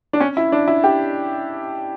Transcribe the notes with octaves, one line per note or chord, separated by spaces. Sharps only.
D4
C#4
E4
D4
E4
G4